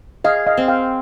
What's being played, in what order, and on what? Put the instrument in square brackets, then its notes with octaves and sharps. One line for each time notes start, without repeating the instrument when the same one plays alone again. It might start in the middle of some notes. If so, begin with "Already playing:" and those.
[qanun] G#4 [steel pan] D#5 F5
[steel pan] D#5 F5
[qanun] C4
[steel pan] F5 G5